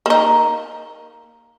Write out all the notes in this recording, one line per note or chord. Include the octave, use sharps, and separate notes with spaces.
A#3 D#4